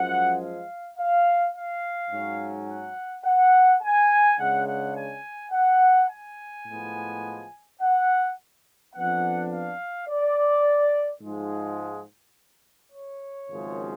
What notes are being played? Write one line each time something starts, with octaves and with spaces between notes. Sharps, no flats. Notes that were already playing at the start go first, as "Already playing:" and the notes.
Already playing: F#2 F3 G#3 F#5
F5
F5
F5
G#2 F#3 C#4
F#5
F#5
G#5
C#2 C#3 G#3 D4 F#5
F#5
G#5
F#5
G#5
A2 F3 G#3 B3
F#5
F2 F3 B3 D4 F#5
F5
D5
G#2 F3 G#3
C#5
G#1 F#2 C#3 F3 G#3